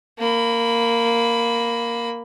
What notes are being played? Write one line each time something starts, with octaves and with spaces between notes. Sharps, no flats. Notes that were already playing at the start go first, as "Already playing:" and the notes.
A#3 B5